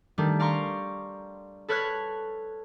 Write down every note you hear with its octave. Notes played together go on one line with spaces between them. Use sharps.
D#3 G3 A3 D4
D5 F5 A#5 C6 C#6
A4 B4 C#5 F6 F#6 G#6